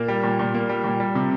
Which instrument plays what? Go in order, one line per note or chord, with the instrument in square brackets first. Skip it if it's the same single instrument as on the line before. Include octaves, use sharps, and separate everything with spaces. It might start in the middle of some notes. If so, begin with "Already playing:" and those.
Already playing: [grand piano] A#2 A#3
G3
A#2
A#2
A#3
G3
A#2
G3
C3